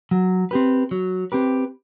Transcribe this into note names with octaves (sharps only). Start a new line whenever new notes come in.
F#3
C4 G4 B4
F#3
C4 G4 B4